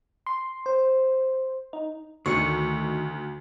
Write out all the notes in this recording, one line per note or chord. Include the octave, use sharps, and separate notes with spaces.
C6
C5
D#4
D2 D3 D#3 D#4 C#6 C#7